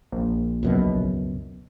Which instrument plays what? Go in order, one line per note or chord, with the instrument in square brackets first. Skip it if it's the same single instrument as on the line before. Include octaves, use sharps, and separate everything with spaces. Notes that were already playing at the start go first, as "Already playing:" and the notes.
[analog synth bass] A#1
[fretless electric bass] C#2 F#2 B2